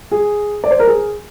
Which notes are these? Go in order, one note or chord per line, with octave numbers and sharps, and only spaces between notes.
G#4
D5
C5
A#4
G#4